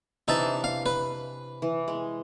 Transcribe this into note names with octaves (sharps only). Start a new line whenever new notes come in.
C3 E3 D4 D#4 E5 A5
F5
B4
E3
G#3